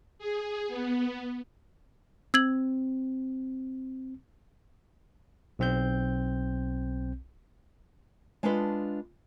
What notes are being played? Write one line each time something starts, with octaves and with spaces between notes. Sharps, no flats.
G#4
B3
C4 E6 G#6 F#7
B1 C4 G6
G#3 D4 F4 A4 B4 D#5